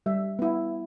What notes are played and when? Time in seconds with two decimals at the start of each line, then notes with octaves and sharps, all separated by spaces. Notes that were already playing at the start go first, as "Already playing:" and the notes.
0.06 G3 E5
0.39 B3 E4